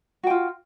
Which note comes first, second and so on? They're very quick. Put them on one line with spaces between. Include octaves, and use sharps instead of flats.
F#4 G5 F4